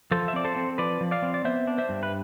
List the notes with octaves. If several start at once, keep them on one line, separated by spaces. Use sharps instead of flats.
F3 A4 C5
E5
C4 D5
A4 C5
C4
F3 B4 D5
F3
D5 F5
C4
D5
B3 C5 E5
D4
C5 E5
G2
B4